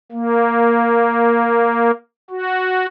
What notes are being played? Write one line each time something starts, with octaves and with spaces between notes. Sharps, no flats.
A#3
F#4